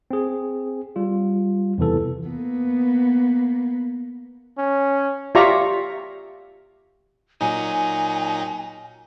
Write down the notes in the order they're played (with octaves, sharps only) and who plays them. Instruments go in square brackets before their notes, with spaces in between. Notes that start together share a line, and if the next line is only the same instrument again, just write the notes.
[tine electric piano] C4 G#4
G3 F4
E2 C3 E3 A4
[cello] A#3 B3
[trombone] C#4
[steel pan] F4 G4 D5 E5 A#5 C#6
[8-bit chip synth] A#2 F#3 D#4 [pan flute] G#5